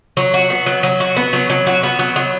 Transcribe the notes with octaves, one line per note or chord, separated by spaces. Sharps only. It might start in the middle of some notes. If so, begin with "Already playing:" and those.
F#3
F#4
B3
F#3
F#3
F#4
B3
F#3
F#3
F#4
B3
F#3
F#3